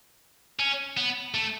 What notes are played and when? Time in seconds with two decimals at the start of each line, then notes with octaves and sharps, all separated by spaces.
0.59 C#4
0.97 B3
1.34 A3